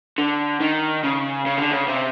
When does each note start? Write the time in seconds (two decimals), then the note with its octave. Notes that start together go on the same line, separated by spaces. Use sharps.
0.18 D3
0.60 D#3
1.03 C#3
1.46 C#3
1.58 D3
1.72 C#3
1.88 C3